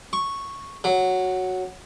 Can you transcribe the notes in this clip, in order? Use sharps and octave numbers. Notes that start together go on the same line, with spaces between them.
C#6
F#3